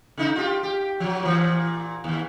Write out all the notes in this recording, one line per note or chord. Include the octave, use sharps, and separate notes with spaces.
C#3 D#4 E4
F4 G4
G4
F3 F#3
A#2 E3
D#2